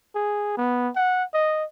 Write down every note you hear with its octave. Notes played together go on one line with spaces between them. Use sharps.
G#4
B3
F#5
D#5